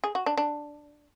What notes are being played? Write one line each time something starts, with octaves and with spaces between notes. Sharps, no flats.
G#4
F#4
D4
D4